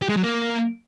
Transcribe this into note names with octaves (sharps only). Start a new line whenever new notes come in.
G4
G#3
F#3
A#3